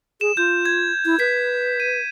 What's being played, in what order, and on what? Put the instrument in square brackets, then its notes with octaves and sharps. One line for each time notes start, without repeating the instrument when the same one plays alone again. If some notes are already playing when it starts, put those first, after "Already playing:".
[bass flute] G#4 [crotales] E7
[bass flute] F4 [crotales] G6
[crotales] G#6
[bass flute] E4
[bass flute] B4 [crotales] B6
[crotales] D#7